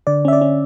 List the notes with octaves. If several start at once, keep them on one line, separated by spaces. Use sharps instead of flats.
D3 D5
C#4 E5
D5
C#4